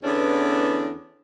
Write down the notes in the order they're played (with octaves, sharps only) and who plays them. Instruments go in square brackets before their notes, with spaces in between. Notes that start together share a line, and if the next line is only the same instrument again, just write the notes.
[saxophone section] E2 D3 E3 B3 C#4 D4